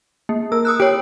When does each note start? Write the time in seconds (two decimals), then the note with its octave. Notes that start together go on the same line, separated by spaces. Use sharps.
0.29 A#3
0.52 A#4 E6
0.65 D#6 E6 F#6
0.80 G4 C#5 D7